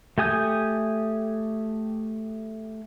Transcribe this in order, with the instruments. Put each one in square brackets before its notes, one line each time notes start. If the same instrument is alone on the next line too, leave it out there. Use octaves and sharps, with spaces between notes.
[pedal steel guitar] A3 G4 G#5 D#6 G6